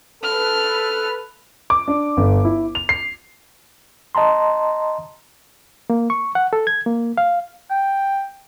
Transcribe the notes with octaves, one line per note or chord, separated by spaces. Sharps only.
A4 B4 F6
D6
D4
G1
E4
F7
C7
D#5 A5 A#5 C6
A#3
C#6
F#5
A4
G#6
A#3
F5
G5